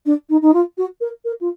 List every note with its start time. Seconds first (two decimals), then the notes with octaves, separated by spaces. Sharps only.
0.06 D4
0.30 D#4
0.42 D#4
0.53 F4
0.78 F#4
1.01 A#4
1.25 A#4
1.41 F4